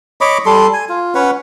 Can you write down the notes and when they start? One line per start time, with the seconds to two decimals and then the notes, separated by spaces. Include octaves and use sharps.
0.21 C#5 D#5 B5 D6
0.46 G3 A4 C6
0.73 G#5
0.89 F4
1.15 C#4 B4 C#5 F#5